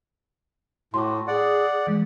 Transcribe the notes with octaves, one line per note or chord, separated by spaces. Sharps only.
A2 F#4 C6 D6
G#4 D5 F#5
E3 G#3